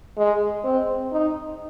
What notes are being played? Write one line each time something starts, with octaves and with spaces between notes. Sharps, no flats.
G#3
C4
D#4